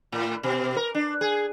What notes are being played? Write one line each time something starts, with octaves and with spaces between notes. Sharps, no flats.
A2
B2
A#4
D4
G#4